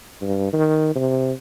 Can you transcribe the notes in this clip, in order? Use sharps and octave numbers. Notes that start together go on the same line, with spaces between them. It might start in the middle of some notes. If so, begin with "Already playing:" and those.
G2
D#3
C3